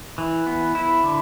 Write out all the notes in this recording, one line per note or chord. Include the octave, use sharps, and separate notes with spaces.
E3
B3
E4
D3